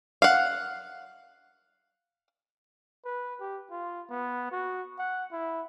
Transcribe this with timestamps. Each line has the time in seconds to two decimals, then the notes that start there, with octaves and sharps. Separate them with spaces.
0.22 F5 F#5
3.05 B4
3.41 G4
3.71 F4
4.10 B3
4.52 F#4
4.99 F#5
5.32 E4